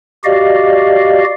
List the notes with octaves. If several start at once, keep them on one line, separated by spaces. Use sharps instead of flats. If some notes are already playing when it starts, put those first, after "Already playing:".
F#4 G4 D5 D#5 F5